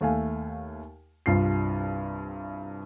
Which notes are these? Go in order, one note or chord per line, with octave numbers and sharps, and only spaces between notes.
D#2 A3 F5 G#5
C2 G2 F4 C7